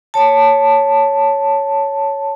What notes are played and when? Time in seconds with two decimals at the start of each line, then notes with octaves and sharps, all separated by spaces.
0.14 C#5 A5